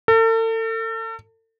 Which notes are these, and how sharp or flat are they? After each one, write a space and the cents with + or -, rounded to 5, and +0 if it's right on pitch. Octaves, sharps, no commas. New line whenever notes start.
A4 +40